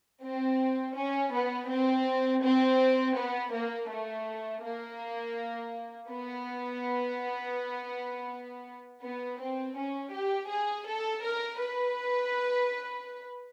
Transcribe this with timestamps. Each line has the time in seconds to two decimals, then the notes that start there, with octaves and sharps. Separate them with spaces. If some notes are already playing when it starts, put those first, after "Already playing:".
0.23 C4
0.96 C#4
1.33 B3
1.69 C4
2.43 C4
3.16 B3
3.53 A#3
3.90 A3
4.63 A#3
6.10 B3
9.03 B3
9.40 C4
9.77 C#4
10.13 G4
10.49 G#4
10.87 A4
11.24 A#4
11.59 B4